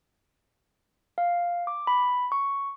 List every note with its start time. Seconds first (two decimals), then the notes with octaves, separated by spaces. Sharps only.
1.18 F5
1.67 D6
1.87 B5
2.32 C#6